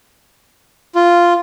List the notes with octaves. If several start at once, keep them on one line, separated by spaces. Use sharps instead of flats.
F4